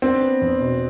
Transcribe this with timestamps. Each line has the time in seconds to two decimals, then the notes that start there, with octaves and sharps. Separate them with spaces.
0.02 C4 D4
0.22 B3
0.41 E2
0.60 B2